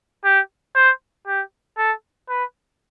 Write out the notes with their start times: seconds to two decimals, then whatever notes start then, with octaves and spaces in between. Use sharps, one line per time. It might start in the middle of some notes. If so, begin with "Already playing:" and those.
0.24 G4
0.75 C5
1.27 G4
1.77 A4
2.29 B4